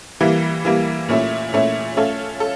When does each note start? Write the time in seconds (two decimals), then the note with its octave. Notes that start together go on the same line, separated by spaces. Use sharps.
0.20 E3 G3 A#3
0.65 E3 G3 A#3
1.09 A#2 A3 C#4 E4
1.53 A#2 A3 C#4 E4
1.97 A3 C#4 F4 A4
2.40 A4